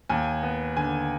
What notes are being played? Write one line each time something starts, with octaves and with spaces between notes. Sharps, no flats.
D#2 G#5
B3
D3 G#5